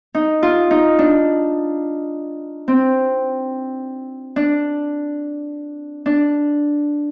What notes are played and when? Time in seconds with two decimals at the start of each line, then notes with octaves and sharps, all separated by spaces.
0.15 D#4
0.43 F4
0.71 D#4
0.99 D4
2.68 C4
4.36 D4
6.06 D4